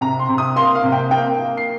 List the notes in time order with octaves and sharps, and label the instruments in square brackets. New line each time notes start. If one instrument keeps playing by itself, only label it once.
[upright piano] C3 A#5
C6
C3
D#6
A#3 C6
F5
C3
G5
A#3 G5
A#3
C7